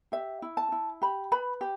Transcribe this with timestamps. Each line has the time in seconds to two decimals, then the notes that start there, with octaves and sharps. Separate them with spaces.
0.12 G4 E5
0.42 E4
0.57 A5
0.72 E4
1.02 G4 B5
1.32 B4 B5
1.61 G4